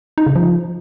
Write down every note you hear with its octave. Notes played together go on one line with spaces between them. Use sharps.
D#4
C#3
F3